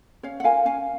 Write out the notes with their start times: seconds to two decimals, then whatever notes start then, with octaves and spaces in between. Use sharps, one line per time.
0.23 C#4 C#5 F5
0.40 F#5
0.44 F4 A#4 F5 G#5
0.65 C#4 F5 G#5